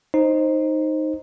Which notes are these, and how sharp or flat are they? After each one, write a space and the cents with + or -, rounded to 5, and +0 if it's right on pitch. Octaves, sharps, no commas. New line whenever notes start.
D#4 +0 C5 +10